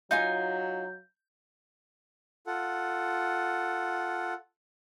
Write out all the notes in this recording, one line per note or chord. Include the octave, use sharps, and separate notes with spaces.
F#3 D#4 F4 G#5 G6
F4 A4 F#5